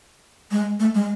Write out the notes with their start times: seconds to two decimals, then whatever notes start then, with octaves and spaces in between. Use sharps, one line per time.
0.51 G#3
0.80 A3
0.95 G#3